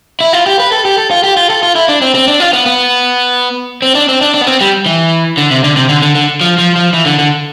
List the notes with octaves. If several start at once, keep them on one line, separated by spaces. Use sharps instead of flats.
E4
F4
G4
B4
A4
G4
A4
F4
G4
F4
A4
F4
E4
D4
C4
C4
D4
F4
B3
B3
C4
D4
C4
D4
D4
B3
C4
G3
E3
D3
C3
D3
C3
D3
D3
D3
F3
F3
F3
E3
D3
D3